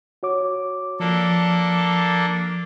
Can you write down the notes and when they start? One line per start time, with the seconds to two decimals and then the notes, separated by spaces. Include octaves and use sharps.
0.23 F#4 C#5 D6
1.00 F3 A#3 D4 A4